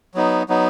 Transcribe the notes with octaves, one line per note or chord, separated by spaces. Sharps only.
F#3 B3 D#4
F#3 B3 D#4